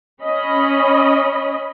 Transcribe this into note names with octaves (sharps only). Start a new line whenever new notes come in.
C#4 D#5 B5